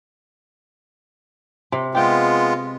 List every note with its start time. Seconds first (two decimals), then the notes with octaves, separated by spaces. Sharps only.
1.72 C3
1.95 G#3 B3 F4 G4 G5